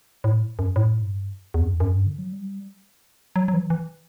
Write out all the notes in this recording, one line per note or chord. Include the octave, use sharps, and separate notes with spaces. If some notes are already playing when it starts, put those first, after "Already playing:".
A2
F#2
A2
G2
E2
F#2
E2
F#2
G2
D3
F#3
G3
F#3
F#3
E3
E3